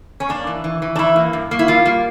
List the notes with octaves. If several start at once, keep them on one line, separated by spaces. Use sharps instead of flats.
C#4
A#3 D4
E3
E3
E3
D4
E3 E4
A#3
G2
A#3
E4
G3 F4
A#3